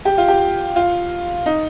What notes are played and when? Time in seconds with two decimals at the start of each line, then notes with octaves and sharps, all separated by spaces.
0.05 G4
0.18 F4
0.28 G4
0.76 F4
1.46 D#4